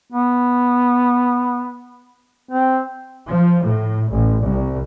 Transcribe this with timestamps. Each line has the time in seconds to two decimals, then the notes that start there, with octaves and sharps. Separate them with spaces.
0.12 B3
2.51 C4
3.29 F3
3.65 A2
4.11 A1
4.47 C2